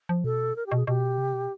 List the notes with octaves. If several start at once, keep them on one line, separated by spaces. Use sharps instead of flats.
F3
B2 A4
A#4
G4
B2
G#4
B2 G4
C3
B2